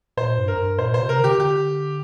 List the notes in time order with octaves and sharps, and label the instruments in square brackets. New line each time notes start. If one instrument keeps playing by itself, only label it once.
[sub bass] A#2 [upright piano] C5
[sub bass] G2
[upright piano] A#4
[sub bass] G2
[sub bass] A#2 [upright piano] C5
[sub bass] C3 [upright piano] C5
[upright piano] A#4
[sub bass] D3 [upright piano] G4
[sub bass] D3 [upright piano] G4